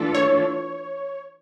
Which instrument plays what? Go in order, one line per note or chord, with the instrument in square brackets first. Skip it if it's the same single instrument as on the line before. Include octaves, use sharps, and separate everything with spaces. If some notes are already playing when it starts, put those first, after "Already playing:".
Already playing: [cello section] E3 A3 D4 F4 A4
[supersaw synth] C#5